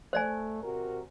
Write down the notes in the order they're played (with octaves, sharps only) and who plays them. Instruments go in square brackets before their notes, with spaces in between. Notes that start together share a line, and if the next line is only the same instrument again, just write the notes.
[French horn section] A3 [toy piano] C5 D5 G#5
[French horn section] C3 F#4 A#4